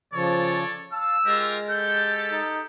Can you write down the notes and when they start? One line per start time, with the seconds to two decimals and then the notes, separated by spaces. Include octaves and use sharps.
0.14 C#3 F3 A4 C#5 D5 C#6
0.93 F5 A5 E6
1.25 G#3 F4 G4 A#4
1.69 G4 A4 G6
2.32 D#4